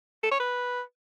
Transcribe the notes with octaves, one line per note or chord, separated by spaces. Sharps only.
A4
C#5
B4